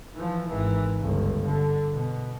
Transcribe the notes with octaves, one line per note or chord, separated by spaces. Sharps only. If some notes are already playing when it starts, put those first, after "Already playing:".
E3 F3
G#1 E3
G1 C#2
D3
B2